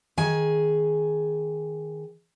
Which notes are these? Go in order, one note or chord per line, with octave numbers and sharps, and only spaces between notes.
D#3 G#4 G#5